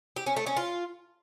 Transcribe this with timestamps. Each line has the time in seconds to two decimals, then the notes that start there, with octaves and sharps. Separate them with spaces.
0.16 G4
0.26 C#4
0.36 A3
0.47 C#4
0.57 F4